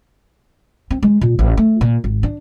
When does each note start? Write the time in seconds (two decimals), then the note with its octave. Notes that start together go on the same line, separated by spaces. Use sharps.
0.91 C4
1.03 G#3
1.21 A#2
1.39 A1
1.57 A3
1.81 A#2
2.04 G#1
2.23 D4